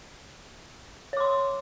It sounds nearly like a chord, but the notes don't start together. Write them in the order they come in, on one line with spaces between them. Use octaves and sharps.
C#5 D6 C6